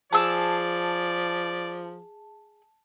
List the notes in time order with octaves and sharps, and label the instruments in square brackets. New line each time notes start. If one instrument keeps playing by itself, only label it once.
[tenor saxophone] F3 [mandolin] G#4 E6 [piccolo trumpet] D5 [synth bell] A5